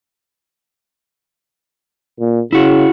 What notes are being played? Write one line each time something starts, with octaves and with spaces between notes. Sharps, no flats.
A#2
C#3 E4 F#4